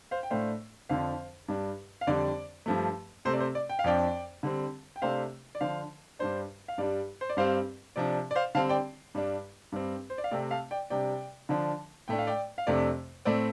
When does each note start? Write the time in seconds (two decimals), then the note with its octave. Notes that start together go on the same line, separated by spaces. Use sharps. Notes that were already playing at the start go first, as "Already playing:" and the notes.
0.11 C5 F5
0.23 G5
0.30 A2 A3 D4 C5 F5
0.89 F2 D3 F3 C5 F5
1.48 G2 G3 D4
2.01 F5
2.07 F2 D3 G3 D4 D5
2.66 G2 F3 A3
3.25 C3 A3 C4 C5
3.33 D5
3.40 C5
3.55 D5
3.69 G5
3.79 F5
3.84 F2 F3 D4 D5 G5
4.43 D3 G3 C4
4.96 G5
5.02 C3 A3 D4 C5 F5
5.55 D5
5.61 D3 F3 D4 C5 F5
6.19 G2 G3 D4 C5
6.68 F5
6.78 G2 G3 D4 D5
7.21 C5
7.29 D5
7.37 G2 G3 C4 C5 F5
7.96 C3 F3 D4 D5
8.31 D5
8.35 C5 F5
8.55 D3 G3 C4 F5 A5
8.69 D5 G5
9.15 G2 G3 D4
9.72 G2 G3 C4
10.10 C5
10.18 D5
10.24 F5
10.31 C3 A3 C4 D5 G5
10.51 F5 A5
10.71 D5 G5
10.90 C3 G3 D4 D5 G5
11.49 D3 F3 D4
12.08 A2 A3 D4 G5
12.19 F5
12.27 D5 G5
12.58 F5
12.67 F2 C3 A3 D4 D5
13.25 A2 A3 C4 D5